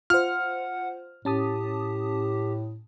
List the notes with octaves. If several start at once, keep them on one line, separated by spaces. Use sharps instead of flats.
F4 C5 F#5 F6
A2 C#4 G4 A5 D#6